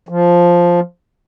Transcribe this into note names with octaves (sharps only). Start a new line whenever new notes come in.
F3